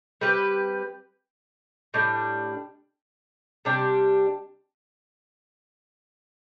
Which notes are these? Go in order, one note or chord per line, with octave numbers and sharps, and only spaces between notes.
G3 C4 G4 B4
A2 G3 D4
C3 G3 D4 G4